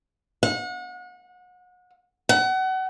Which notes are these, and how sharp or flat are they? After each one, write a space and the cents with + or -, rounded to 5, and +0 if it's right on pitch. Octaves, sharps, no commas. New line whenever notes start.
F#5 -35
F#5 +30